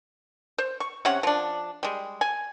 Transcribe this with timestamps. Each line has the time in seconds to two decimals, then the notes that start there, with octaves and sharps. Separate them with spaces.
0.58 C5
0.80 C#6
1.05 C3 C#4 C#5 F#5
1.23 F3 D4
1.83 G3 G#3
2.21 G#5